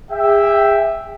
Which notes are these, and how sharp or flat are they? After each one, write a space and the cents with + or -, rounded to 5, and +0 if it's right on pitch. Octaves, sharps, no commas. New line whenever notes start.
G#4 -35 E5 +0 G5 +0